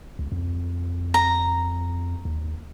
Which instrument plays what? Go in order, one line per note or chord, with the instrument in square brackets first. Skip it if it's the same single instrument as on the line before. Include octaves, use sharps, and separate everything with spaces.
[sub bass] C#2
F2
[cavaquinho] A#5
[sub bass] D#2